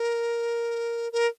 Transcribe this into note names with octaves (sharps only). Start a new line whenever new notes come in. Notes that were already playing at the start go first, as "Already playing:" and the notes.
Already playing: A#4
A#4